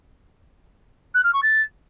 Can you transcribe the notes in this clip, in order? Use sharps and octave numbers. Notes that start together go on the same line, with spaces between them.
F#6
F6
C#6
A6